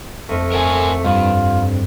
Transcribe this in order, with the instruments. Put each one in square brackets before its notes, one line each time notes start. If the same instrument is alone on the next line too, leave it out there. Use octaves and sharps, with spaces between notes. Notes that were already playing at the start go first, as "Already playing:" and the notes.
[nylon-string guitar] F2 [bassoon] A3
[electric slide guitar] A#4 F#5 G#5
[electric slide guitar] G2 [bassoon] F4